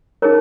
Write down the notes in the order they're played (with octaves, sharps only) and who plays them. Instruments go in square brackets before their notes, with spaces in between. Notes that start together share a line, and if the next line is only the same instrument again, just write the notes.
[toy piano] D#4 G#4 A#4 C#5 A#5